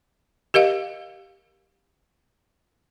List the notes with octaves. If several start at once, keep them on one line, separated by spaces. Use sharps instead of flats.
G4 A#4 D#5 F5